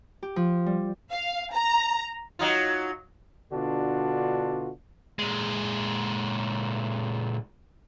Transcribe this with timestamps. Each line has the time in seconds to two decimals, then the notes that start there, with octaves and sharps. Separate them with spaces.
0.23 G4
0.36 F3
0.66 G3
1.12 F5
1.54 A#5
2.39 F#3 D#4 F4
3.52 B2 D3 D4 F4 F#4
5.19 A#2 G#3